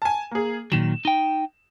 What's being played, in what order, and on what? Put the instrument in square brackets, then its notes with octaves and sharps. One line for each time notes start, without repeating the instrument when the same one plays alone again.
[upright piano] G#5 A5
A#3 G#4
[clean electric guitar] A#2 D#3 F#3 [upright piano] E7
[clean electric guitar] D#4 G5